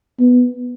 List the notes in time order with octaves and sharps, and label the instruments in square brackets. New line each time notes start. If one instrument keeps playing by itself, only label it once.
[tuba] B3